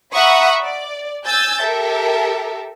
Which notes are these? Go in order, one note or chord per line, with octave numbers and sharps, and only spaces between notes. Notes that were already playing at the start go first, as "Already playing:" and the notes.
E5 F#5 A#5 B5 C#6 D#6
D5
G#5 E6 G6 A6
G4 A4 A#4 E5